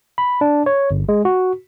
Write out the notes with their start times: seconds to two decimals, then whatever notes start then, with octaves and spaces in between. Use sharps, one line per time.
0.18 B5
0.41 D4
0.66 C#5
0.91 G1
1.09 G#3
1.25 F#4